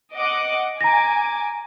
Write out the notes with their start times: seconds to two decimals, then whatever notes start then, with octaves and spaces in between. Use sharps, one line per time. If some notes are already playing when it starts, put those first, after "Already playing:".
0.15 D#5 F#5 D6
0.81 G#5 A#5 D6 A#6